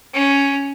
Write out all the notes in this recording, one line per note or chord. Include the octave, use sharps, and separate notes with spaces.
C#4